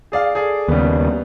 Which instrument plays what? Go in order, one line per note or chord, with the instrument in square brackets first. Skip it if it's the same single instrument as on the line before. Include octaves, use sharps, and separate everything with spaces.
[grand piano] G#4 D5 F5
G#4 A4 D5
[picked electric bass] D#2 C#3 [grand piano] G3 B3